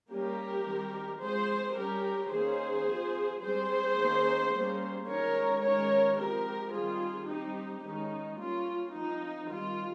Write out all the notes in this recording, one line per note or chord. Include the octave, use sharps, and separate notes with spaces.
G3 A#3 C#4 G4 A#4
D#3 G3 C4
F3 G#3 C4 G#4 C5
G3 C#4 G4 A#4
D#3 A#3 C#4 G#4 C5
F3 C4
G3 C4 G#4 C5
D#3 A#3 C#4
G3 A#3 C#4
D#3 G#3 C#4 A#4 C#5
D#3 G#3 C#4 A#4 C#5
F3 G#3 C4 G4 A#4
D#3 G3 C4 F4 G#4
G3 C4 D#4 G4
D#3 G#3 C#4 D#4
G3 A#3 C#4 F4
F3 C4 D#4
D#3 G3 C4 F4